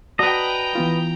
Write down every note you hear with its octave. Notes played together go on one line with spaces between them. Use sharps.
F#4 B4 D5 D#5 G5 A5 A#5
E3 B3 F4